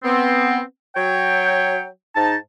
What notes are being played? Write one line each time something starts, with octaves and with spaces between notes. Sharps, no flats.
B3 C4
F#3 C#5 G5
G#2 D#4 A5